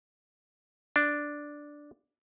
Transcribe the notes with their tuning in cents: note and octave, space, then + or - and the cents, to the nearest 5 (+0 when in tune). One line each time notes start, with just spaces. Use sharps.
D4 +0